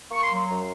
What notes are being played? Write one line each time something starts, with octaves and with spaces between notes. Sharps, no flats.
A#3 C#6
C6
F#3
C6
F#2 A#5